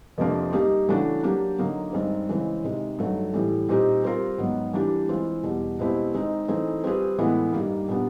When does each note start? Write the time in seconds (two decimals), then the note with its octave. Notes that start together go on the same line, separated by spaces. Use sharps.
0.18 F2 C3 F3 A#3 D4
0.53 G3 A#3 D#4 G#4
0.88 C#3 E3 A3 D4 F#4
1.24 F#3 A#3 D4 G4
1.58 D3 F#3 A#3 D#4
1.93 G2 D#3 G#3 C4
2.29 C#3 E3 G#3 C4
2.64 C3 D#3 G#3
2.98 G2 D#3 F#3 A3
3.34 A2 E3 G3
3.69 A#2 G3 C4 D#4 G4
4.04 G3 C4 F4 A#4
4.38 G#2 D#3 F#3 B3
4.73 E3 G3 A#3 D4 G4
5.09 E3 G#3 C4 F4
5.43 E2 B2 G3
5.79 B2 G#3 C4 E4 G4
6.14 D#3 G#3 C4 D#4
6.48 E3 A3 C4 D#4 G#4
6.84 G3 C4 F4 G#4 B4
7.18 A2 E3 G#3 B3 E4
7.53 G2 D#3 G3 A#3
7.88 A#2 G3 B3 D4